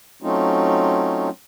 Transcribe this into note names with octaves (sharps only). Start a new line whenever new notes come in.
F#3 A3 C4 C#4 D#4 F4